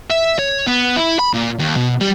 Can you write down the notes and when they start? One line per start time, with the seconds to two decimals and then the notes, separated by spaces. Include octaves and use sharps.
0.10 E5
0.39 C#5
0.67 B3
0.96 E4
1.19 B5
1.34 A#2
1.59 D#2
1.76 B2
2.01 G3